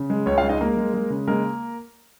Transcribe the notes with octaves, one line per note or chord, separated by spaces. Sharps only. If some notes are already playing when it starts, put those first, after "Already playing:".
Already playing: C#3
G#3
C#2 C#4 C#5
F4 F5
G#3
D#4 D#5
G#3 A#3 A#4
G#3
G#3
C#3
G#3 A#3 A#4